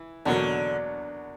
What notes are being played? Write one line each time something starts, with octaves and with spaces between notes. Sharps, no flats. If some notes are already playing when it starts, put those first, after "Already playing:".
Already playing: E3
E2 B2 D3 F#3 A#3